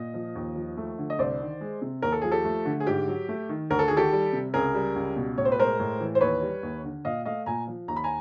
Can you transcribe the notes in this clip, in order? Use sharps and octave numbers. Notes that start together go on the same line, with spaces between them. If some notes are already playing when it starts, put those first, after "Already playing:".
Already playing: A#2 D#5
F3
D#2
F3
A3
D3
D#5
C2 C5 D5
D#3
G#3
C3
D#2 A#4
A4
F3 G#4
G4 A4
A3
D3
G#4
G#2 G4
F#3
A3
D#3
D2 A#4
A4
D#3 G#4
G4 A4
G3
C3
C#2 G#4 A#4
G3
C#2
B2
A2 C#5
C5
B4
G#3 A#4 C5
A2
E3
C5
D#2 B4 C#5
G3
D#2
D3
A#2 D#5 F5
A3 D#5 F5
A#2 G#5 A#5
F3
D#2 A#5
B5
G#5 A#5